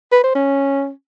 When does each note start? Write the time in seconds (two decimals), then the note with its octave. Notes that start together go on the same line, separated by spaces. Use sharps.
0.12 B4
0.23 C5
0.35 C#4